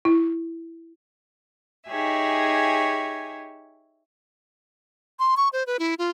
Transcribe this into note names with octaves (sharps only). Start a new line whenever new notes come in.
E4
D#4 G4 G#4 C#5 E5 G#5
C6
C#6
C5
B4
E4
F4